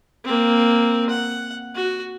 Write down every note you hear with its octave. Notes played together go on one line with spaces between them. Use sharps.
A#3 C4
F#5
F#4